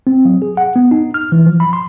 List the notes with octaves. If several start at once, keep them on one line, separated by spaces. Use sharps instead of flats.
C4
F#3
G#4
F#5
B3
D#4
F6
E3
F3
B5
C6